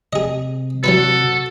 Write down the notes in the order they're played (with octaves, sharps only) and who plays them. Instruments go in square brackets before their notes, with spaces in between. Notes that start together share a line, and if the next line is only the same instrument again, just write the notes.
[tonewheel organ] C3 [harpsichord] G#4 D#5
[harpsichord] F#3 E4 B4 [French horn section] F#4 [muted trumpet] A4